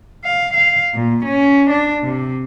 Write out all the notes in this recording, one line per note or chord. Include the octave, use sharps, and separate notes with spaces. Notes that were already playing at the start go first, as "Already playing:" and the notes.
F5
F5
A#2
C#4
D4
C3